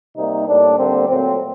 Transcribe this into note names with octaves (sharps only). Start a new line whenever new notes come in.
C3 G3 A#3 D#4
A2 G3 A#3 D4
D3 G3 A#3 C4
A#2 F#3 A3 C4